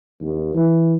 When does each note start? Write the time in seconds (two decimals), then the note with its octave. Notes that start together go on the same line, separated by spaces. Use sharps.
0.20 D#2
0.54 E3